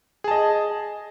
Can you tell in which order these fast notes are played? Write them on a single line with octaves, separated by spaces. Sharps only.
G#4 A5 D#5